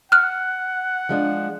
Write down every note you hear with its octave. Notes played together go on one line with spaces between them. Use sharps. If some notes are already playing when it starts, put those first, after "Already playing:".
F#5 F6 F#6
F3 G#3 D4